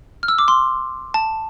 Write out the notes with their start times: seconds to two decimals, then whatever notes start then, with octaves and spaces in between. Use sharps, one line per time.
0.23 F6
0.28 E6
0.38 D6
0.48 C6
1.14 A5